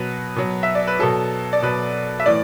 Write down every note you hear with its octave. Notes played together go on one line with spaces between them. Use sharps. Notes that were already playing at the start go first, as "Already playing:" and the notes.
Already playing: B2 F#3 B4
B2 F#3
E5
D5
B4
B2 F#3 A4
D5
B2 F#3 B4
E5
A2 E3 D5